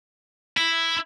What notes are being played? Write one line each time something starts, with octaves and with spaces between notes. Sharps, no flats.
E4